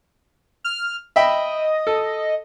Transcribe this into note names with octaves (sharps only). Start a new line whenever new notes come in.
F6
D#5 E5 G5 B5
A4